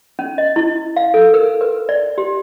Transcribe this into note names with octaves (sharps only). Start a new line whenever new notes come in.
C#4
D#5
E4
F5
A4
A#4
B4
D5
G4